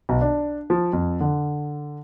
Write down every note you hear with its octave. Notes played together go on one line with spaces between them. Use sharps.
B1
D4
F3
F2
D3